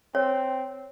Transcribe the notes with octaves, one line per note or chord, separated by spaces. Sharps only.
C4 C#5